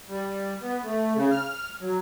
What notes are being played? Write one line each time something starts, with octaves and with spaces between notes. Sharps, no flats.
G3
B3
A3
C#3
F6
F#3